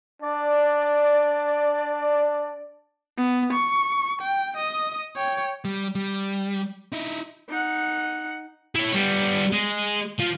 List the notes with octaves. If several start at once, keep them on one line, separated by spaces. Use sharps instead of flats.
D4 D5
B3
C#6
G5
D#5 D#6
C#5 G5
G3
G3
D#4 E4
D#4 F#5
E4 C#5
G3 B3
G#3
F3